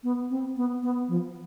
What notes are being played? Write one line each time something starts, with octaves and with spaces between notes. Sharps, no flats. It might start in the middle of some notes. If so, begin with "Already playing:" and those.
B3
C4
B3
B3
F3